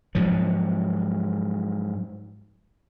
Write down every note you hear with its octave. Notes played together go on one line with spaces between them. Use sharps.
G#2 F3 F#3